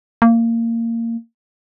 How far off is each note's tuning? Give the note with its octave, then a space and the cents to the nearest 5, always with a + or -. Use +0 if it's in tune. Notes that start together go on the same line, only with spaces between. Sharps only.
A#3 -20